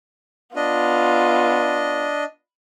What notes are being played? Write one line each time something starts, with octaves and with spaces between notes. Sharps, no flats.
B3 D4 F4 D#5